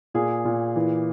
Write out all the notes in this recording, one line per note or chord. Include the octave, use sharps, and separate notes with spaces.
A#2 G#4
A#2
E3